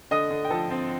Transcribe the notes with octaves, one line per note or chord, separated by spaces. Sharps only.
D3 D#5 D#6
D3
G5
F3 A4 A5
C4